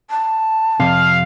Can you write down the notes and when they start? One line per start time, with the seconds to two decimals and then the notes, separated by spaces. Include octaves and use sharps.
0.10 A5
0.80 F2 C3 F5